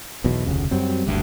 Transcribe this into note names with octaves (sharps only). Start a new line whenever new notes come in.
B1 E2 B2
F1 D2 C#3
F#2 F#3 G3 C4
F#1 D2 G2